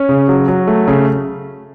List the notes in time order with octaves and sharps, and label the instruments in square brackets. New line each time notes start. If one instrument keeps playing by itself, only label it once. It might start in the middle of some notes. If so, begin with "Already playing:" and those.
Already playing: [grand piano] C#4
C#3
F#3
F#3
A3
C#3